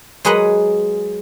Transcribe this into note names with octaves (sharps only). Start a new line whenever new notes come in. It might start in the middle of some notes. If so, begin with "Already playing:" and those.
F#3 G#3 G#4 B4 D#5 F#5